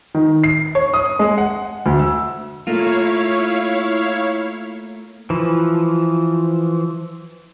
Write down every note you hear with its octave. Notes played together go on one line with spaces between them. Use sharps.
D#3
C7
C#5
D#6
G#3
F#5
D2
E6
A3 A#3 E4 F4 C#5 F5
E3 F3